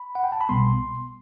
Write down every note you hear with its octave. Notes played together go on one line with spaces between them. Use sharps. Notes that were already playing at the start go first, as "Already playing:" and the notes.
Already playing: B5
F#5
G5
A5
B5
B1 B2 G3 B3 C6